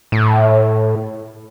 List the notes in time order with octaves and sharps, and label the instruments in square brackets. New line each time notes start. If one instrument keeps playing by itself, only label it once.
[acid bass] A2